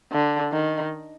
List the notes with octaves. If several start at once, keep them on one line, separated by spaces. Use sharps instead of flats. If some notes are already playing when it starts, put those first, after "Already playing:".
D3
D#3